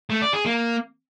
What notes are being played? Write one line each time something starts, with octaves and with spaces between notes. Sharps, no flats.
A3
D5
G#4
A#3